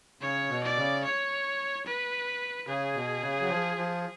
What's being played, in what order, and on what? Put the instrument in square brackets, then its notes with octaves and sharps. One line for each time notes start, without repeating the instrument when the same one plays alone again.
[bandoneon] C#3 [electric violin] C#5
[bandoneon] B2
[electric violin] D5
[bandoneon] C#3
[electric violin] C#5
B4
[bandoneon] C#3 [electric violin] G#4
[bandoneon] B2
C#3
F#3
F3
F3